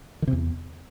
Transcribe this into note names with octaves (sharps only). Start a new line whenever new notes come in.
D#3
C3
E2